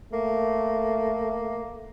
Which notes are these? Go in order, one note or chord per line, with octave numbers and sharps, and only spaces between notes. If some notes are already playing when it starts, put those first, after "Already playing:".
A3 A#3